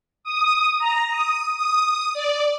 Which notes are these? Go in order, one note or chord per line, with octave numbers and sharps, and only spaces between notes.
D#6
A#5
D#6
D#6
D5